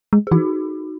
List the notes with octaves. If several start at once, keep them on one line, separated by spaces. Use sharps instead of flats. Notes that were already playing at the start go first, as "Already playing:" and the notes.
G#3
G#4
E3 D#4 F#4